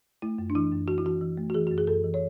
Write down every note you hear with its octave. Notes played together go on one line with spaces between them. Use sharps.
A3 E4
F#2
D4
E3 E4
F#2
E3 F#4
E4
E3 F#4
E3
A3
F#4
E3 G#4
F#2 F#4
G#4
F#2 A4
E3
C#5